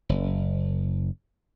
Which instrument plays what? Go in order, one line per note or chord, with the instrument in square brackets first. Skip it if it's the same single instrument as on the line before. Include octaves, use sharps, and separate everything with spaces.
[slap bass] F#1